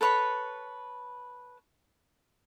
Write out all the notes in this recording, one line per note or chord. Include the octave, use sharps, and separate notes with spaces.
A4 B4 C#5 B5